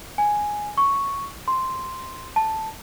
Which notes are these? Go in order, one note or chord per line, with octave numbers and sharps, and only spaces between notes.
G#5
C#6
C6
A5